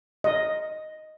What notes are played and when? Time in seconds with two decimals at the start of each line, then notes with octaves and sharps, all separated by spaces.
0.24 D#5